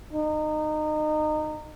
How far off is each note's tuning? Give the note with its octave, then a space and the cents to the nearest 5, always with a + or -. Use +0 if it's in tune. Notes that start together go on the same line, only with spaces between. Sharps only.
D#4 -25